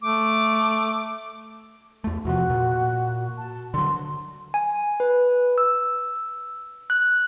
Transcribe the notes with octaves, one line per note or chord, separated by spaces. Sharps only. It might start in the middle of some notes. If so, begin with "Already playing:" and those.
A3 D6
E2 A3
E2 C3 F3 F#4
A#2
A5
D3 F#3 C6
G#5
B4
E6
F#6